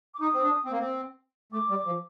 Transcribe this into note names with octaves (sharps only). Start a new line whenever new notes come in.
D6
D#4 D#6
C4
D4
C4
A#3
C4
A3 D6
G3
F3